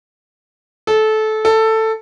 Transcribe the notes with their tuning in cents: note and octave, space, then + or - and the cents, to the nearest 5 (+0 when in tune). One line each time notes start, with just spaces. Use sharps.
A4 -20
A4 +10